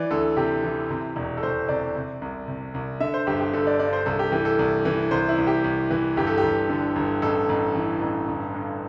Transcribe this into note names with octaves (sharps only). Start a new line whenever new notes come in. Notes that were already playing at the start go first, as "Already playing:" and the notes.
Already playing: E3 D5
D2 A4
C3 G4
E3
C3
E1
A4
E1 C5
C3 D5
C3
C2
C3
C2
D3 E5
C5
G1 G4
G4
D3 A4
D5
G2 D5
C5
C2 A4
G4
E3 G4
A4
C2
E3
C2 C5
E4
C2
G4
C2
E3
G1 G4
A4
G4
G1
D3
G1
A1 A4
A1
E3
A1
G1
G2